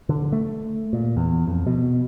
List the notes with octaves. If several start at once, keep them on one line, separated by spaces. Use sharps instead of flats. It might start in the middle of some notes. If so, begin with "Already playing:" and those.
D3
A3
A#2
E2
F2
B2